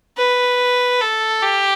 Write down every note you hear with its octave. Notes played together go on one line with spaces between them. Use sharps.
B4
A4
G4